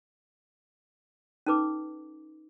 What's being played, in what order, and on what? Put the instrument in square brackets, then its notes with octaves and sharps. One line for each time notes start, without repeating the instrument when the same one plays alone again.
[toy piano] C#4 D#4 A4 B4 D6